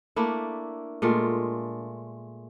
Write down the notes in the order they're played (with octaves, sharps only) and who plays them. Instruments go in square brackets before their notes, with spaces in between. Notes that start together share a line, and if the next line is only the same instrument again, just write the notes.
[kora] A3 A#3 D4 E4
A#2 G#3 A3 F4